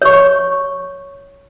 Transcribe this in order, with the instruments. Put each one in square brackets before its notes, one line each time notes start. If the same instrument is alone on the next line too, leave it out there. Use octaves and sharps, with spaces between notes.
[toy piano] C#5 C#6